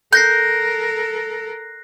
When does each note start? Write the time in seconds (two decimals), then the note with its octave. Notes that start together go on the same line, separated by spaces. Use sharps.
0.13 A4 A#4 F#6 G6 A#6 C7